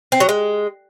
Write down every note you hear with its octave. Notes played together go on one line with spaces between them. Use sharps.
C4
F#3
G#3